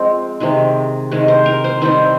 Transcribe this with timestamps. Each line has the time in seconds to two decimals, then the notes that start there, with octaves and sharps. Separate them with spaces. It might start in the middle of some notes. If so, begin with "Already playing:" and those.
Already playing: F3 G#3 C4
0.40 C3 D#3 G#3
1.12 C3 D#3 G#3
1.28 C5
1.46 A#4
1.64 C5
1.82 D#3 G3 C4 C5